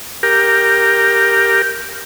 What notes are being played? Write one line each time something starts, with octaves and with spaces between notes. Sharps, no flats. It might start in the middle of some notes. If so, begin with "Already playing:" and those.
G4 A#4